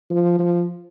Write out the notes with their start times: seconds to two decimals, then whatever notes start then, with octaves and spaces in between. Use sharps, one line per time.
0.10 F3
0.39 F3